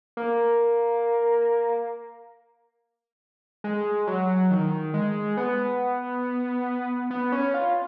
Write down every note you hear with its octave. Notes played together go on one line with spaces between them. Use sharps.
A#3
G#3
F#3
D#3
G#3
B3
B3
C#4
F4